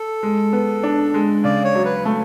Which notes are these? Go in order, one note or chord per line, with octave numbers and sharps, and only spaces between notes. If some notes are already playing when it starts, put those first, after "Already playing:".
Already playing: A4
G#3
B3
D4
G#3
C#3 D5
C#5
F#3
B4
A3